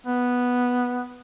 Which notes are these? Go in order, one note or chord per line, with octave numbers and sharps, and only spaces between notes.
B3